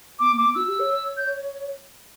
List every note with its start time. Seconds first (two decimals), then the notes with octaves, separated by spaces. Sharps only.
0.19 B3 D6
0.32 A#3
0.37 D6
0.44 B3
0.55 F#4 E6
0.67 G4
0.79 C#5
0.91 C#5
1.17 G6